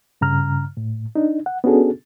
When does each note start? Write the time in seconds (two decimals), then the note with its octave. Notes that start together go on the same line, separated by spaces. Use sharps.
0.21 G2 C#3 A#5 F6
0.77 A2
1.15 D4 D#4
1.46 F#5
1.64 B3 C#4 D4 F#4 G#4 A4